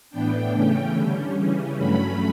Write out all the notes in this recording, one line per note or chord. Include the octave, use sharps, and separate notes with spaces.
A2 E3 B3 D4 G5
C#3 E3 A3 C#4 G5
D3 G3 C#4
C#3 E3 G3 C#4
G2 F#3 A3 C#4 B5